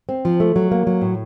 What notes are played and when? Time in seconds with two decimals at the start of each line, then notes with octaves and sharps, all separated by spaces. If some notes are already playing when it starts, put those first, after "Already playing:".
0.09 C4
0.25 F3
0.40 A3
0.56 F#3
0.71 A#3
0.87 F#3
1.01 A2